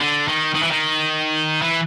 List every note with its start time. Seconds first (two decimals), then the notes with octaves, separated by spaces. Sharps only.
0.01 D3
0.28 D#3
0.54 D#3
0.62 E3
0.71 D#3
1.62 E3